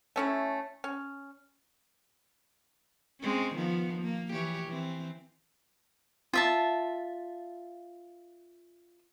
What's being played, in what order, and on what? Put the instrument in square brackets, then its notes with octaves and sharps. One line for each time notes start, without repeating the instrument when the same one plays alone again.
[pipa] A3 C#4 E4
C#4
[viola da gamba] G#3 C4 C#4
D#3 F3 B3
A#3
E3 G4 C#5
E3 C4
[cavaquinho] F4 E5 A5